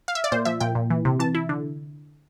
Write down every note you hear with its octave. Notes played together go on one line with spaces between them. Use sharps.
F5
E5
D5
A#2 C5
F3 E5
A#2 G5
A#2
E3
C3
E3 A5
E4
D3